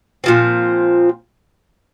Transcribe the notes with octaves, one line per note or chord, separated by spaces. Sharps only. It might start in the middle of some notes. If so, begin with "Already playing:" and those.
A#2 F3 C4